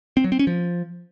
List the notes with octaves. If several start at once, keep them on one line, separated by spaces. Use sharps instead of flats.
C4
F#3
C4
C#4
F3